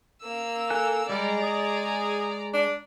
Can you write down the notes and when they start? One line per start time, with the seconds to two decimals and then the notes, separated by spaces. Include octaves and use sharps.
0.22 A#3 E6
0.70 A4 G#5 F#6
1.10 G3 G#3 D5 A#5
1.43 G#4
2.53 D4